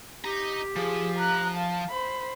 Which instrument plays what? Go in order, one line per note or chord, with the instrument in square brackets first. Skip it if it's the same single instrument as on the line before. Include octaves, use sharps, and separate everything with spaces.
[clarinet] G4 [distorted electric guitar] D#5 A#5
[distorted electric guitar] F3 [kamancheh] G#4
[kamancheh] A#5 F#6
F5 A5
C5 B5